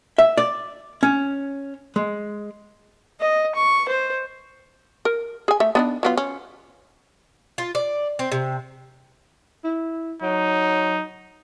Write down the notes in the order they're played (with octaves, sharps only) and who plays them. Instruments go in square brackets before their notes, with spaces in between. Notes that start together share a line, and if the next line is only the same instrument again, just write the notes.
[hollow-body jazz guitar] E5
D5
C#4
G#3
[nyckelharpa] D#5
C#6
C5
[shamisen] A#4
G#4 G#5
A3 E5
B3 D4 D#4
F#3 B3 F4
C#4
[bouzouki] F4
D5
C4
C3
[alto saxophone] E4
[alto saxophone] F#3 [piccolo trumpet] D#4